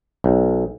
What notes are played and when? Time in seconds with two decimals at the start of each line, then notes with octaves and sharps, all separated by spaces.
0.24 B1